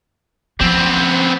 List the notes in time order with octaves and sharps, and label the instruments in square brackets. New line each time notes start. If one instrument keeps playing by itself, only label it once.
[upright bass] F3 [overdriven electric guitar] B3 C4